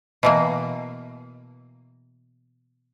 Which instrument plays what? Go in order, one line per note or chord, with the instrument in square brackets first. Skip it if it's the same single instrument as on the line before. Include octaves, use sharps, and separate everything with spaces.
[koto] B2 E3 A#3